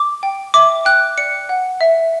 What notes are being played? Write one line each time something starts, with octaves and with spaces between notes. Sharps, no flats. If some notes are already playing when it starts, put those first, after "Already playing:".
Already playing: D6
G5
E5 D6
G5 F#6
D5 C#7
F#5
E5